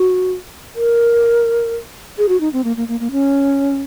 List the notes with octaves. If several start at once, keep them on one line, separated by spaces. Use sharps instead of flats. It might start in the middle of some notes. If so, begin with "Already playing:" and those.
Already playing: F#4
A#4
G#4
F#4
D#4
C4
A#3
A#3
A#3
A#3
C#4